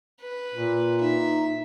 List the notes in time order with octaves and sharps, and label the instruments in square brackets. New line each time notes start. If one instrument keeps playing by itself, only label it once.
[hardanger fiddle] B4
[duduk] A#2
[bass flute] D#4 [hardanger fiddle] E5